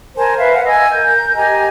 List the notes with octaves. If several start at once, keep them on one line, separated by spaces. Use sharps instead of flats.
A#4 C5 G#5 A5
B4 E5 F5
F5 F#5
D#5 G#5 E6
A#4 G6
G4 D#5 G#5 A#5